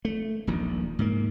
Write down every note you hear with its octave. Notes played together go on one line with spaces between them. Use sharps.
A3
D#1 A#1 D#3
G#2 A#3